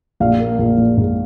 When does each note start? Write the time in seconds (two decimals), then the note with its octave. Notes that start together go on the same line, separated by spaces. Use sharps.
0.20 A#1 F5
0.39 A#3
0.59 A#1
0.78 A#1
0.97 G#2